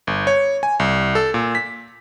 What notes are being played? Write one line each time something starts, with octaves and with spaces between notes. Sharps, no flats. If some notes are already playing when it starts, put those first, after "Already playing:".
G1
C#5
G#5
C2
A4
A#2
B6